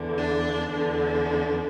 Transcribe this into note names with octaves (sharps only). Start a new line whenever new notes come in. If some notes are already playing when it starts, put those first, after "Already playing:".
Already playing: E2 D3
D4
E2 D3 D4